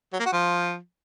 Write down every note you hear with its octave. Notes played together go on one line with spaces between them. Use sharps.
F#3
A#3
F#4
F3